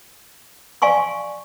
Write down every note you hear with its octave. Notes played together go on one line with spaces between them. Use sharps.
D5 F5 G#5 C6 C#6